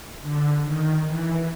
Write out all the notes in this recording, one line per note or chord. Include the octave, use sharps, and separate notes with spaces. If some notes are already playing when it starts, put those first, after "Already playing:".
D3
D#3
E3